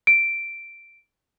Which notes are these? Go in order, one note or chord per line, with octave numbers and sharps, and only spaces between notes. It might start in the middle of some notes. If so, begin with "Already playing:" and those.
D7